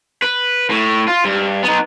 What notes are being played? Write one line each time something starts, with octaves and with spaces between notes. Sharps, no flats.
B4
A2
F4
G2
B3 D#4